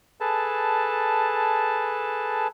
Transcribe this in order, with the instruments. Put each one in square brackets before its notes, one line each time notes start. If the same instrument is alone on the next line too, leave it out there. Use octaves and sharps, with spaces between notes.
[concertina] G#4 A4 B4 A5